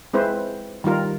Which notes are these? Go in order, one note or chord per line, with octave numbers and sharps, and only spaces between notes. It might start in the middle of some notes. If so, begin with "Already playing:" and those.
G#3 C4 E4 B4 C5
D#3 G3 F4 A#4